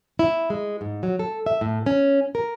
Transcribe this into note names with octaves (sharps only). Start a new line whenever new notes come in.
E4
G#3
G#2
F#3
A4
E5
A2
C#4
A#4